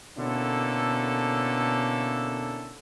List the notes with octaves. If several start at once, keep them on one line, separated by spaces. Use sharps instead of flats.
B2 D3 A#3 C#4 E4 A4